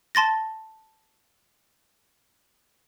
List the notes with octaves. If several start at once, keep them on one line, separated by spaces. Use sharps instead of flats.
A5 C6 A6 A#6